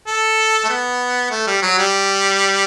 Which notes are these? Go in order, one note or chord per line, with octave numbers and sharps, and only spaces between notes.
A4
A3
B3
A3
G3
F#3
G3